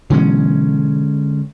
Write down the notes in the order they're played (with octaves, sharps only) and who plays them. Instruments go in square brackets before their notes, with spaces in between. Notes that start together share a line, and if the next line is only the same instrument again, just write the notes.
[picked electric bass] B2 E3 F#3 [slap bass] D3 G#3 C#4